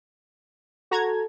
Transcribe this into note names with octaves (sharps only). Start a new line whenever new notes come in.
F#4 A4 A#5 G#6